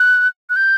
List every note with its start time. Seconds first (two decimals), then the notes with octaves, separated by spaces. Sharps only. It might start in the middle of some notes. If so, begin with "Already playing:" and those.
Already playing: F#6
0.50 F#6
0.56 G6